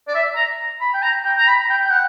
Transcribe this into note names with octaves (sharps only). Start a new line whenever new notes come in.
D5
E5
A#5
B5
G5
A#5
G5
A#5
B5
G5
G5
F#5